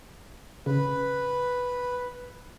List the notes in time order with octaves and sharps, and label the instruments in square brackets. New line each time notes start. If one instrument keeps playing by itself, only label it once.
[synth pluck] C#3 [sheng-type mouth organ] B4